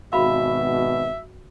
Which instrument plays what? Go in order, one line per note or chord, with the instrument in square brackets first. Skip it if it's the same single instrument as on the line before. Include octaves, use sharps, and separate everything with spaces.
[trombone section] G#1 B2 [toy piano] F#4 F5 B5 [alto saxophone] E5